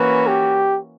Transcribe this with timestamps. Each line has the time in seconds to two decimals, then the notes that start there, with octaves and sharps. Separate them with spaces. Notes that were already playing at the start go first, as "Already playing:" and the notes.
Already playing: E3 A#3 C#4 F#4 B4
0.28 G4